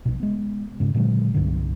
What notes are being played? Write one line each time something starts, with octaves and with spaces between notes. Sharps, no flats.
A#1 B2
G#3 B3
G#2 C#3
A#2 D3 F#3 G#3
C2 G2 D3